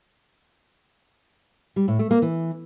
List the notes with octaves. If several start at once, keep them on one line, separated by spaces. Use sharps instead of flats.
G3
A2
A3
A#3
E3